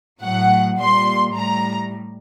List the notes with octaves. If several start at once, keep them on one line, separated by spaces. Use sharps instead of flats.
A2 F#3 F#5
A#2 G3 C6
A2 G3 A#5